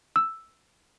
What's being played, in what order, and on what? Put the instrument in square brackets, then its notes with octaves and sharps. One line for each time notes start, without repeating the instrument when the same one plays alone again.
[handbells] E6